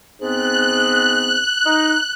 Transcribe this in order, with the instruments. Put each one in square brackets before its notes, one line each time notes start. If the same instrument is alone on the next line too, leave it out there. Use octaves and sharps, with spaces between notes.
[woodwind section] G#2 B3 C4 [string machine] F#6
[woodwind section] D#4